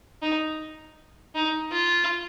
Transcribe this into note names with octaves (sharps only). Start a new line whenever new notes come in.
D#4
D#4
F4